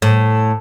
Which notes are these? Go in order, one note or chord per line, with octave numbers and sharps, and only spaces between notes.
A2